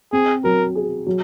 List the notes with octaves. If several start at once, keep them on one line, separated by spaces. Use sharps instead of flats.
C4 G#4
F#3 A#4
G#4
F#3